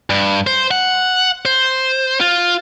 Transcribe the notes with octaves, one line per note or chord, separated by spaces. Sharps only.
G2
C5
F#5
C5
F4